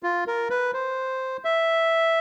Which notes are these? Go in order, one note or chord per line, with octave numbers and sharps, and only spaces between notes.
F4
A#4
B4
C5
E5